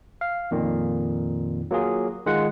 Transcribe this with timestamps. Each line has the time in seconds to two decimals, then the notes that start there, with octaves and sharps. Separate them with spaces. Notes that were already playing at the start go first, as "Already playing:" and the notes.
0.21 F5
0.51 F2 A#2 D#3
1.71 F#3 A#3 F4 G#4
2.26 D#3 G#3 F4 F#5